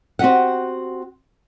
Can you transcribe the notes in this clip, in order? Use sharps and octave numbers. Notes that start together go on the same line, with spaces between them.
C4 F#4 G4 D#5 F#5